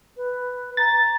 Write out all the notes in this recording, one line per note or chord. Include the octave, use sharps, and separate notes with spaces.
B4
A#5 A6